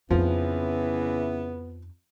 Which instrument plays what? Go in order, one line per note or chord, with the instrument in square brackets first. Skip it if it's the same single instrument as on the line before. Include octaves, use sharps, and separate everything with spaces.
[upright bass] F2 D#4 [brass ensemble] C#3 E3 E4 [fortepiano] F3 [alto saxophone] B3